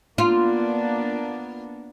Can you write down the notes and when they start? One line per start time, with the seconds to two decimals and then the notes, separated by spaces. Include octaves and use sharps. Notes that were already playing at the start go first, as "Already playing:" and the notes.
0.18 A#3 B3 D4 F4